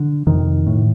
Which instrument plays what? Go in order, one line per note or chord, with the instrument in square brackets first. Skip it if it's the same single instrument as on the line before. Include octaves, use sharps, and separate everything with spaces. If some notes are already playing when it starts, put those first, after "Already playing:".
Already playing: [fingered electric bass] D3
F2 C3 D#3
A2